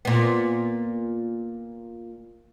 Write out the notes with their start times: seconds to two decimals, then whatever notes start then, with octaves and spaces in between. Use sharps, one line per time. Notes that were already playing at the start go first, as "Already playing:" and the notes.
0.05 A#2 B3